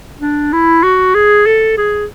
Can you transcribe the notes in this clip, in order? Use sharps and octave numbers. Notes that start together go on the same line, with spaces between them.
D4
E4
F#4
G#4
A4
G#4